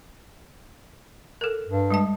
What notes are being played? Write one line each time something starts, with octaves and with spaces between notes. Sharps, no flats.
A4 A#4
G2
G3 G#3 A5